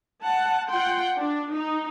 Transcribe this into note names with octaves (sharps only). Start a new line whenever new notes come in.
F#5 A5
F4 F#5 G5 C6
D4
D#4